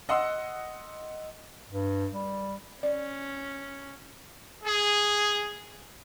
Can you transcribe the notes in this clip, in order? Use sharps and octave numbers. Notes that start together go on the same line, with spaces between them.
D#5 F#5 C6 E6
G2
G3
C#4 D5
G#4